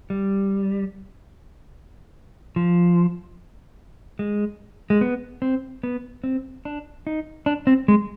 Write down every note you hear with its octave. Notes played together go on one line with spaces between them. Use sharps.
G3
F3
G#3
G#3
B3
C4
B3
C4
D4
D#4
D4
C4
G#3